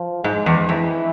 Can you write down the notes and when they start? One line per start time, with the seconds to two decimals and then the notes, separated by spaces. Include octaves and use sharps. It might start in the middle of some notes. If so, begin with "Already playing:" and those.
Already playing: F3
0.24 G#2 G#3
0.46 E2
0.69 F2 E3